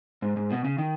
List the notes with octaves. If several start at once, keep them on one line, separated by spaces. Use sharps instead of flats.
G#2
G#2
B2
C#3
D#3